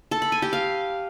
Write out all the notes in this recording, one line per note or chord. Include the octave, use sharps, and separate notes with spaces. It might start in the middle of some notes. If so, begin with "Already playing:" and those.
A4
B5
G#5
G4
F5